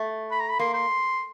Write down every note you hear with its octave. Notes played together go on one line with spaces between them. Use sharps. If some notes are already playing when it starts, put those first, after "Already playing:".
Already playing: A3
B5
A#5
B5
A#3 C6
C6